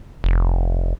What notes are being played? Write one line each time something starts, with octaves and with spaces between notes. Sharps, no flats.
F1